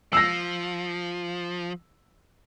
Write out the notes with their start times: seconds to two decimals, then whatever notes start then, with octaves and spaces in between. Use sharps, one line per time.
0.13 F3 E6 A#6